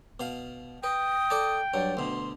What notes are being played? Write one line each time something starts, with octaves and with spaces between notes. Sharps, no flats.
B2 F5
B4 G5 D#6
A4 D5 A5
G2 F#3 D5
D2 B2 C6